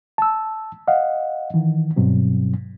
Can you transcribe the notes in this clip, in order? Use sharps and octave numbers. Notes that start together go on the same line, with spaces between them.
A5 E6
D#5 F5 F#5
D#3 E3
G2 B2 F#3 C4